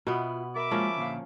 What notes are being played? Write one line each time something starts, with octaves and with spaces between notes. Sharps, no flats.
B2 B3 F4 E5
A#4 E5 B5 D6
F3 G#3 A#3 C#4 F4 A#4
D2 A#2 F5